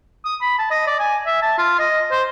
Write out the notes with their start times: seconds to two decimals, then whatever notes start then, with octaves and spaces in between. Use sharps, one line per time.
0.25 D#6
0.41 B5
0.59 A5
0.71 D#5
0.87 D5
0.99 G#5
1.26 E5
1.42 A5
1.58 F4
1.79 D#5
2.11 C5